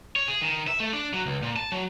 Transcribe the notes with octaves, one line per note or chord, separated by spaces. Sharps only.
C#5
G#4
D#3
E5
A3
D4
F#3
C#2
A#2
A5
F#3